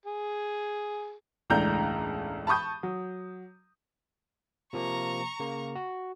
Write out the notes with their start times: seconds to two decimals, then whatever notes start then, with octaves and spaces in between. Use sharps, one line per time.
0.06 G#4
1.50 E1 C#2 A2 D4 A#5 G6
2.47 A5 B5 C#6 D#6 G6
2.83 F#3
4.73 C3 F3 A#3 A#5 C#6
5.40 C#3 A#3
5.75 F#4